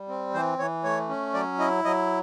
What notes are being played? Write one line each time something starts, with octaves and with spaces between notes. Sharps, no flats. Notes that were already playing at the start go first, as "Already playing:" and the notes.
Already playing: G3
C4
E3 C5
E3 C#5
A3 C#5
C#4
F#3 D5
E4 D#5
F#3 D#5